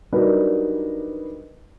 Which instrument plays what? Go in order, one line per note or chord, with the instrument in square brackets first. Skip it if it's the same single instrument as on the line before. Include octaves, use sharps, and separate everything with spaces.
[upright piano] F#3 G3 D4 D#4 A#4 B4